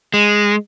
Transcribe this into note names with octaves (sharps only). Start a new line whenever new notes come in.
G#3